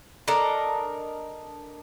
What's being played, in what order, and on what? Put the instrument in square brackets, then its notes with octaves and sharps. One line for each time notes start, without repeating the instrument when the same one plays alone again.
[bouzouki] D4 A4 A#4 D#5